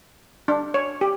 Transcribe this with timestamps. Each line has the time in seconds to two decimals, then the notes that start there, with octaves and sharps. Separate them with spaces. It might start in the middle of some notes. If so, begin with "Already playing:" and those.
0.48 D4
0.74 C#5
1.01 G4